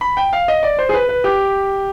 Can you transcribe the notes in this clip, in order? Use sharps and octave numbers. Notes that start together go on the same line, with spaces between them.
B5
G5
F5
D#5
D5
C5
G#4
B4
B4
G4